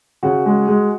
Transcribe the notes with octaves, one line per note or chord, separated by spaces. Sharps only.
C#3 F#4
G#3
G#3